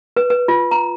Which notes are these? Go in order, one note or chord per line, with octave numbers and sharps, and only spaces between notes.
B4
B4
F4
A#5